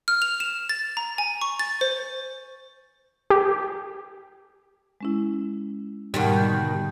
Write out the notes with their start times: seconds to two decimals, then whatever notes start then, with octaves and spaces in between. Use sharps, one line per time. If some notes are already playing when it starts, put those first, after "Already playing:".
0.08 F6
0.22 F7
0.40 E7
0.69 A6
0.97 A#5
1.18 G#5
1.42 C#6
1.60 A6
1.81 C5
3.30 G4
5.01 G#3 C#4 E4
6.14 G#2 B2 D#3 G3 F#5
6.36 D3 G6